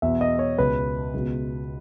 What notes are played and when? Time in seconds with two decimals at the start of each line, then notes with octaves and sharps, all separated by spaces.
0.02 E2 B2 E5
0.21 D#5
0.39 C#5
0.58 C#2 B2 B4
1.14 C#2 B2